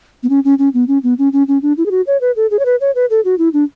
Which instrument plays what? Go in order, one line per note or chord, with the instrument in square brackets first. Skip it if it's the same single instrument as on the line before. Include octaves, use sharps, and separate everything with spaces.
[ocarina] B3
C#4
C#4
C#4
B3
C#4
B3
C#4
C#4
C#4
D4
E4
G#4
F#4
C#5
B4
A4
G#4
C#5
B4
C#5
B4
A4
F#4
E4
D4